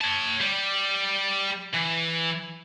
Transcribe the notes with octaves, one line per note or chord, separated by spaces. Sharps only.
C#5 A5
G3
E3